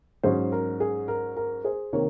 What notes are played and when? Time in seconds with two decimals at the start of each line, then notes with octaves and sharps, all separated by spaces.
0.23 G#2 F#3 C#4 G#4 C5
0.52 A#4
0.80 G#4
1.08 A#4
1.37 A#4
1.64 G#4 C5
1.93 C3 D#3 A#3 A#4 C#5